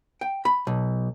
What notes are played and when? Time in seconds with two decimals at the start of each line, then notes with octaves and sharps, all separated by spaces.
0.21 G5
0.45 B5
0.67 B1